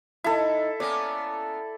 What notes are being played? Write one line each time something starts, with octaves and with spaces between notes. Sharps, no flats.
A2 D#4 E4 A4
A#3 B3 C#4 D5